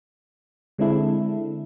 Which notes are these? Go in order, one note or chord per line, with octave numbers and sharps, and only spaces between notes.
D3 G#3 C4 D4 E4 A4